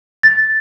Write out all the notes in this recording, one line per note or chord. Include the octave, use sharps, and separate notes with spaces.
A6